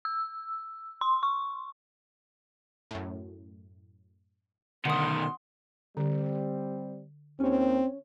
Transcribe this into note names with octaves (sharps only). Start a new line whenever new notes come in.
E6
C6
C#6
F#2 A2
B2 D3 D#3 F#5 C6 D#6
D3 G3 C4
D#2 C4 C#4 C#5